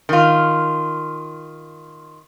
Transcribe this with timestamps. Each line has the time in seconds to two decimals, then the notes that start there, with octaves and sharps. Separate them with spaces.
0.09 D#3 F4